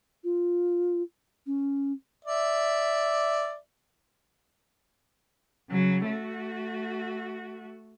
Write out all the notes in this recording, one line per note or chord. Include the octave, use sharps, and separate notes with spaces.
F4
C#4
D5 E5
C#3 F#3
A3 F#4